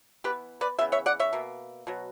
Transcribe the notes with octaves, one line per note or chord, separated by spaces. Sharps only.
E3 B3 G4 B4
B4 D5
C#3 E3 B3 E5
C#5 E5
D5 F#5
C#5 E5
B2 A#3
B2 F#3